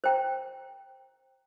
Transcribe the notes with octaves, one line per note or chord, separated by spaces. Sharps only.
C5 G5 A#5